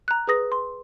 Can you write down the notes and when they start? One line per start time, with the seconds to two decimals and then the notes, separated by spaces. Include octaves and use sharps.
0.08 A#5 F#6
0.27 G#4 B4 D#6 A#6
0.52 C6